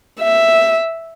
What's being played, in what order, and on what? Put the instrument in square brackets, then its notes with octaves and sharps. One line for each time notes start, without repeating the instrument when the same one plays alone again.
[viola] E5